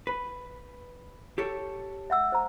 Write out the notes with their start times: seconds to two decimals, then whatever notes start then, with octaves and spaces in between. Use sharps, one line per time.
0.07 B4
1.38 G4 A4 C#5
2.10 E5 F#5 E6
2.32 C5 A#5